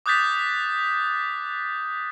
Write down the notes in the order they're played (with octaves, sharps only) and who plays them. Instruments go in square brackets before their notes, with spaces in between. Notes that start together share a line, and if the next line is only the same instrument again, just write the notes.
[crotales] D6 D#6 F#6 G6 A6 B6